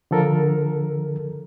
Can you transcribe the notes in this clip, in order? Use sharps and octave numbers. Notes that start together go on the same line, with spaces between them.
D3 F3 A4 A#4